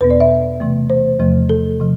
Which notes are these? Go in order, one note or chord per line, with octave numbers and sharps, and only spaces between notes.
E2 B2 B3 B4
D5
E5
C3 E3 A3
C5
E2 C3 F3 A3
A4
C3 F3